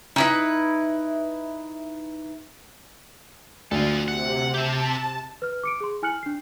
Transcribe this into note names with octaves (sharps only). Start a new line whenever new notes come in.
D#4 E4 B4
D2 F4 A4
C3 F#5
G4 E5 A5
B4 F6
D6 C#7 D7
G#4 C6
E4 G#5 F6 F#6 C#7 F#7
D4 C7